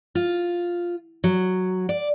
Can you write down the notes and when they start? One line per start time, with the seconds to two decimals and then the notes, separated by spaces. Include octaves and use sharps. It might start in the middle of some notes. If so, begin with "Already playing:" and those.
0.15 F4
1.24 F#3
1.89 D5